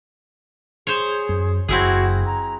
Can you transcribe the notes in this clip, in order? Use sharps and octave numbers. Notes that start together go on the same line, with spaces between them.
G#4 C5 C#5
F#2
F#1 C4 E4 F#4 G#4
A#5